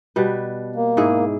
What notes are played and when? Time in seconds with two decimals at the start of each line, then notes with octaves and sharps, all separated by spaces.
0.16 B2 G3 B4
0.76 A#3
0.97 G#2 E4 G#4